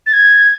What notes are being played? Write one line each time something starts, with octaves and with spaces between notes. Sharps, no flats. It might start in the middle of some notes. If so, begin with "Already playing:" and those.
A6
G#6